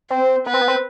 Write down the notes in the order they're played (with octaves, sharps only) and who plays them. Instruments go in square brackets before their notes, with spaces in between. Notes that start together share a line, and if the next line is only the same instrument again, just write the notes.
[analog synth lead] C4 [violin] C5
[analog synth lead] B3 [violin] B4
[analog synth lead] C4
B3
C4